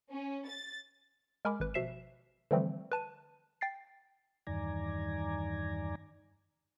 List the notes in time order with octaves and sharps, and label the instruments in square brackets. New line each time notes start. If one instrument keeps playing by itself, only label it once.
[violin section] C#4
A6
[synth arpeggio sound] G#3 A#4 G#5 B5 D6
G#1 B4
B2 F3 E5 C7 E7
D3 E3 F3 G3 A3 C4
B4 A5 D#7
G5 A6 C7
[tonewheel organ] E2 G2 D#3 D5 G#5 A#5